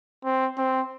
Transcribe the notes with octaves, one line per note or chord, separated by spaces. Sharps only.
C4
C4